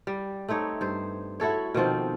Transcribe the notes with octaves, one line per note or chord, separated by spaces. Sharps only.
G3
A3 C4 D#4 C#5
G2 C5
E4 F#4 A4 C#5
B2 D#3 F3 C4